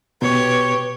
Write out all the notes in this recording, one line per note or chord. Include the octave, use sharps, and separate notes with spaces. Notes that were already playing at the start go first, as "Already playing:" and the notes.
B2 G4 B4 C#5